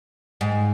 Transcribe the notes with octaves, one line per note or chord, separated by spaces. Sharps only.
G#2